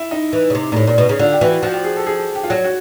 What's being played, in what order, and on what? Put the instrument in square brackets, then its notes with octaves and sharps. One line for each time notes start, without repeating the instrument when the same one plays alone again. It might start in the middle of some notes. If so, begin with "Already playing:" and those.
Already playing: [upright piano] E4
D#4
[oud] E3
C#3
C3
A#2
A2
A#2
B2
C#3
[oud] D3 [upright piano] F4
[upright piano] G4
[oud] E3 [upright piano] F#4
[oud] F3 [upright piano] F#4
[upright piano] G4
G#4
A4
G#4
G4
F4
[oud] F#3 [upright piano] F#4
[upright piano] F#4